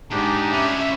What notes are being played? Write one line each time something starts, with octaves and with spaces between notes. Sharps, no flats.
E2 G#2 D4 D#4 G4
C#4 B4 E5